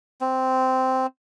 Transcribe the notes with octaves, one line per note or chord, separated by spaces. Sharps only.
C4